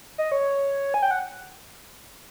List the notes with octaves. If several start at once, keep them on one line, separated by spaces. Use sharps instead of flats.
D#5
C#5
G#5
G5
F#5